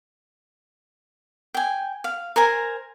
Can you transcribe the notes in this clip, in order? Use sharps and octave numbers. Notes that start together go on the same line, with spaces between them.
G5 G#5
F5
A#4 C5 G#5 A#5